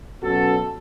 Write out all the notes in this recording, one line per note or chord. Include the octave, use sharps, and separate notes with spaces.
B2 F#3 C#4 F#4 A4